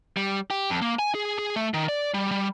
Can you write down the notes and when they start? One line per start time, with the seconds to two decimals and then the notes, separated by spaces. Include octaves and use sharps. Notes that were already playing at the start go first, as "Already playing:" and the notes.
0.17 G3
0.51 G4
0.70 F2
0.82 A#3
0.99 G#5
1.15 G#4
1.39 G#4
1.56 A3
1.74 D#3
1.88 D5
2.14 G3
2.31 G3